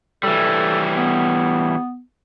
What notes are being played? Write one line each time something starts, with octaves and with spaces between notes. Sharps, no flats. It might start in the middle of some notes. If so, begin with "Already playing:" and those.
E3 G3 A4
B3